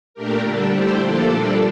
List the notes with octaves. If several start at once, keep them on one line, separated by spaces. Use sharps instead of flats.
A#2 A3 D4 G4 A#4
D3 G3 D4 A4
A3 E4 G4 C5
F3 A#3 D4 A4 D5
A#2 G3 D4 A4